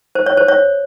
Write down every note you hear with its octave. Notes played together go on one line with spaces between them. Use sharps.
C5
C#5
C5
C#5